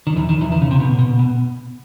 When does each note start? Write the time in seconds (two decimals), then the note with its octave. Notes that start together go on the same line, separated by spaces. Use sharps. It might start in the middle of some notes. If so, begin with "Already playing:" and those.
0.07 D#3
0.16 E2 E3
0.29 D#3
0.41 E2 E3
0.52 D#3
0.62 C#3
0.71 C3
0.80 B2
0.99 B2
1.19 B2